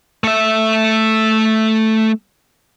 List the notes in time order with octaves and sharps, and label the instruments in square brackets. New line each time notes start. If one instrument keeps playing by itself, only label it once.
[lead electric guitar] A3 E5